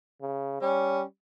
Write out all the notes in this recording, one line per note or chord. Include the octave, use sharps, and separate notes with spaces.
C#3
G3 C#4